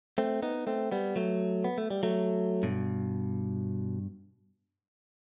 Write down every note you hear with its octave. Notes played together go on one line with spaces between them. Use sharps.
A3 C4
B3 D#4
A3 C4
G3 B3
F#3 A3
B3
A3
G3
F#3 A3
G2 B2